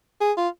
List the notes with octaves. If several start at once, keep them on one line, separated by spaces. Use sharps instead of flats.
G#4
F4